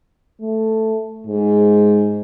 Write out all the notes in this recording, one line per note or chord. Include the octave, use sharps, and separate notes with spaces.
A3
G#2